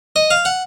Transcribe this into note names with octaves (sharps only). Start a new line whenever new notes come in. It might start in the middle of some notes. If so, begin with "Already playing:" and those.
D#5
F5
F#5